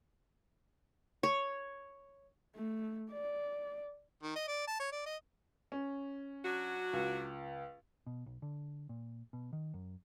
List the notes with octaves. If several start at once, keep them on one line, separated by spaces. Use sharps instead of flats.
C#5
A3
D5
D#3
D#5
D5
A5
C#5
D5
D#5
C#4
F#3 D4 F#4
C#2
B2
B1
D3
A#2
B2
D#3
F#2